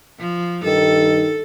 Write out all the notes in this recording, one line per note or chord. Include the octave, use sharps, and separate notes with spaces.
F3
G2 D#3 A4